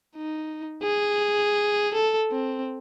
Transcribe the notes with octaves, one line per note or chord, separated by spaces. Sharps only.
D#4
G#4
A4
C4